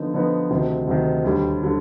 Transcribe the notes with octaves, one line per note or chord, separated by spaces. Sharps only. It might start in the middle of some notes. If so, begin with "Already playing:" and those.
Already playing: D3 F3 B3 D#4
D3 F3 B3 D#4
D2 C3 D#3
D2 C3 D#3
D#2 D3 G3
D3 G3